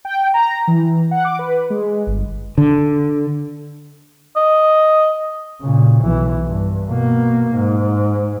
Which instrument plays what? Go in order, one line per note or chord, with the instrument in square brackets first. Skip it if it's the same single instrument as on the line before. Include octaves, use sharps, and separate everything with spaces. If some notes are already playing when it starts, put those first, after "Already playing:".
[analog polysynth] G5
A#5
E3
F#5
D6
B4
G#3
G1
[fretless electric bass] D3
[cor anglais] D#5
[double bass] A#2 C#3
B1 E3
G2
B2 A#3
G#2